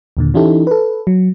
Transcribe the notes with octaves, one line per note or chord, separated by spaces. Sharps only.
D#2 A#2 D3
E3 C#4 D#4 E4 G4 A4
A4 B4
F#3